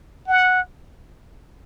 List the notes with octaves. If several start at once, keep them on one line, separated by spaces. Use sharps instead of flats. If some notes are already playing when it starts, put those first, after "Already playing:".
F#5